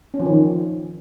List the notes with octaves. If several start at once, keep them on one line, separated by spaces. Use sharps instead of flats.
C#4
F3
D#3